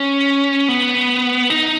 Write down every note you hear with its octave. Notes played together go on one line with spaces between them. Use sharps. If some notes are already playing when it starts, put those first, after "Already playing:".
Already playing: C#4
B3
D#4